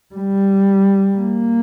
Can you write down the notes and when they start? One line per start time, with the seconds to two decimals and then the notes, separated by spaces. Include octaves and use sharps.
0.15 G3
1.17 A#3